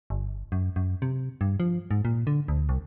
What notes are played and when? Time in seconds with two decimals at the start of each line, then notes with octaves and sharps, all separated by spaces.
0.10 G1
0.52 F#2
0.76 F#2
1.02 C3
1.41 G2
1.60 F3
1.91 G#2
2.05 A#2
2.27 D3
2.48 D2
2.69 C2